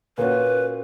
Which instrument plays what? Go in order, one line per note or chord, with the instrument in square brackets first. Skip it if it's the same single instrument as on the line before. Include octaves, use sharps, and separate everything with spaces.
[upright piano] A#2 A#3 C#4 F#4 [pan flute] B4